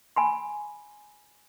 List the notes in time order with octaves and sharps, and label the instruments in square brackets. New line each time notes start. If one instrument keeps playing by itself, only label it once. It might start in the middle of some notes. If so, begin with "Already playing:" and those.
[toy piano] G#5 B5 C6